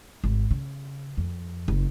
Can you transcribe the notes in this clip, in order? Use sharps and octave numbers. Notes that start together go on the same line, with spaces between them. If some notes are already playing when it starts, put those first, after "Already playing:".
G#1
C#3
F2
F#1